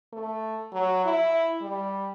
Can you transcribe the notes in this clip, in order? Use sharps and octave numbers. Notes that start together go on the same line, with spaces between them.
A3
F#3
E4
G3